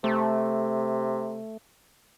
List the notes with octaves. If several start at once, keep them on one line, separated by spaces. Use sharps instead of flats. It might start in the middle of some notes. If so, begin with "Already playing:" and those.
C3 A3